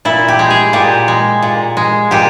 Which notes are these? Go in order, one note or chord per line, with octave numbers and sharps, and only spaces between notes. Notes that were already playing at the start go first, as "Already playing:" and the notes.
A#2 E4
G4
G#3
G#4
A#2 G4
G#3
A#2
G#3
A#2 G4